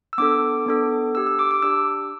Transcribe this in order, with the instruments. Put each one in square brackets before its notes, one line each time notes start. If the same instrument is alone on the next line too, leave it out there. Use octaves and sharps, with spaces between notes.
[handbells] E6
B3 D4 A4 D6
B3 D4 A4
D4 G4 E6
E6
D6
D6
D4 G4 E6